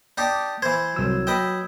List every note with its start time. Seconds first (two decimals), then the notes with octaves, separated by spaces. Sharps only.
0.18 D4 D#4 G4
0.62 E3 C5 G#6
0.96 C2 F#3 E6
1.27 B4 D#5 G5 E6